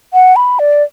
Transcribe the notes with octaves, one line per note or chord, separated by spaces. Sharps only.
F#5
B5
D5